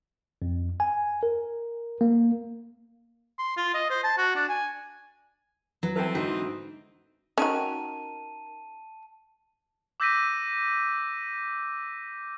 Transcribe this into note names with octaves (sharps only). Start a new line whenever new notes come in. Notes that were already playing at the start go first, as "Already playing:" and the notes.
F2
G#5
A#4
A#3
C6
F4
D#5
C5
A5
F#4
D4
G#5
F#3 B4
E3 C4 A4 B4 G5
E2 G#2 D3 D#4 F#4
D#3 C#4 F#4 A#4 A5 D#7
D6 E6 G6 A#6 B6 D#7